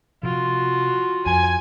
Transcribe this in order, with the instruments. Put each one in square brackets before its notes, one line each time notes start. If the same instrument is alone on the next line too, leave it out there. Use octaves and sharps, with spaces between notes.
[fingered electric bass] C3 F3 [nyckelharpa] F4 F#4
[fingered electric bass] F2 [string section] G#5